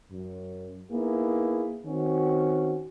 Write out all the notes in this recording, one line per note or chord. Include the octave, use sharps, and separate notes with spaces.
F#2
A#3 B3 D#4 E4 G#4
D#3 C4 C#4 F#4